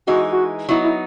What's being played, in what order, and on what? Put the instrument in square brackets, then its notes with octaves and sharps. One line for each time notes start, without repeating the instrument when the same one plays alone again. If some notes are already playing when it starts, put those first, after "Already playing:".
[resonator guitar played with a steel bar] E3 G#3 D#4 [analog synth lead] F#4
[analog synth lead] F#4
[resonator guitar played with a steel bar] F#3 B3 D#4 [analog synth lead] E4
[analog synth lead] E4